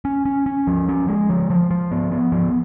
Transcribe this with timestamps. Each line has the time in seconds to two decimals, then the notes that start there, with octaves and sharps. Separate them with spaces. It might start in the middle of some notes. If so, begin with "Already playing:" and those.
0.05 C#4
0.25 C#4
0.46 C#4
0.67 F3
0.89 C#4
1.08 G#3
1.29 F3
1.50 F3
1.71 F3
1.92 B3
2.12 B3
2.32 F3